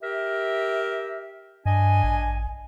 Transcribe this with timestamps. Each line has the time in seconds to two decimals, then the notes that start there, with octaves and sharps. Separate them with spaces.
0.02 G4 A#4 E5
1.65 G2 D4 D#5 G#5
2.04 A1